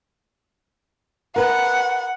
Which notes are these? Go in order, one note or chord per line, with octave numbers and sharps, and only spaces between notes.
A#4 B4 F#5